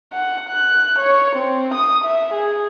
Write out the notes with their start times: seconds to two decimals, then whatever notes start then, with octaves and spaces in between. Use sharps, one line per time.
0.13 F#5
0.49 F#6
0.99 C#5
1.36 C4
1.75 D#6
2.05 E5
2.34 G#4